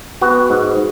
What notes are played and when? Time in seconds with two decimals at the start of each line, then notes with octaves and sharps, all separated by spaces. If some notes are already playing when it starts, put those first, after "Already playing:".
0.21 B3 F#4
0.50 G#2